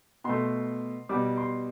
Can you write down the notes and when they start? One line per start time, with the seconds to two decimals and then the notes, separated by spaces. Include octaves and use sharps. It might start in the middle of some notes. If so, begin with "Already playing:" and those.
0.24 B2 A3 C6
1.09 B2 G3 D6
1.38 C6